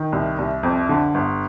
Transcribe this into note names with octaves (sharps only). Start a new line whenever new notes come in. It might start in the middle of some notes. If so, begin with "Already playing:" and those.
Already playing: D#3
C2
C2
F2
D3
G1